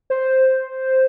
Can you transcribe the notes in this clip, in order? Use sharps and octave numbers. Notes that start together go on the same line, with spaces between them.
C5